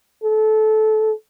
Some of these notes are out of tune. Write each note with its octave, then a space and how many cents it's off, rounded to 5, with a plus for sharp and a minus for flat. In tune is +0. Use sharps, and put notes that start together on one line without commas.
A4 -20